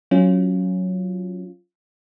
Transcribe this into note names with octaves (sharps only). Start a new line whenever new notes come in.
F#3 C#4 F4